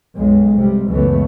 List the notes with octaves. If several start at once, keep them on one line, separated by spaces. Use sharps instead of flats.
B1 F#2 G#3
C3 G3
C#2 F#2 E3 A3 B3